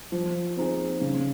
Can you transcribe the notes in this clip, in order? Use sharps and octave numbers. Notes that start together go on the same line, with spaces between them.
F3
C4 D#4 G#4
C#3